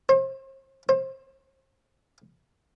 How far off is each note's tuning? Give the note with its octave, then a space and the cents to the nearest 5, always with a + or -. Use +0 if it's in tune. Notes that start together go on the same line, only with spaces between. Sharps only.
C5 +40
C5 +30